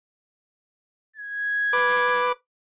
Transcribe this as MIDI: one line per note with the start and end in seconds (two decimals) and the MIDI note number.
1.16 2.28 92
1.73 2.32 71
1.73 2.32 86